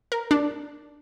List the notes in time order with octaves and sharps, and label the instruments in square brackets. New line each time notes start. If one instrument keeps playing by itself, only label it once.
[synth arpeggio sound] A#4
D4